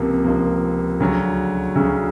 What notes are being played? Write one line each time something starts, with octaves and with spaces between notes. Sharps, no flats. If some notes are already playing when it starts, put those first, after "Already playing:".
Already playing: C#2 C3 F3 A#3
C#2 C3 F3 A#3
D2 C#3 F#3
D2 C#3 F#3